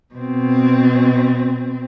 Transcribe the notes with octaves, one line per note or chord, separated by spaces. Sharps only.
B2 C4